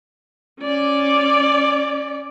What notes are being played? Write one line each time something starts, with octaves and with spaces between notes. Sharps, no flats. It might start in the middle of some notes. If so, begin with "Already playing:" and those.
C#4 D5